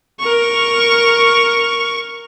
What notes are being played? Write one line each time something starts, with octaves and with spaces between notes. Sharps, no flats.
A#4 C#6